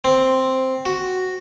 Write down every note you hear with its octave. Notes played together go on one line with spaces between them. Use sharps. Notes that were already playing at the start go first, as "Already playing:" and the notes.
C4
F#4